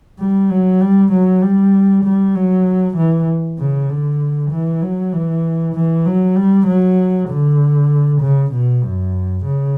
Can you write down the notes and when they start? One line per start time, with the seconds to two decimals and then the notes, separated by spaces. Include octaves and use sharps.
0.19 G3
0.50 F#3
0.81 G3
1.12 F#3
1.42 G3
2.04 G3
2.35 F#3
2.96 E3
3.59 C#3
3.89 D3
4.51 E3
4.82 F#3
5.13 E3
5.75 E3
6.06 F#3
6.36 G3
6.67 F#3
7.29 D3
8.21 C#3
8.53 B2
8.84 F#2
9.45 C#3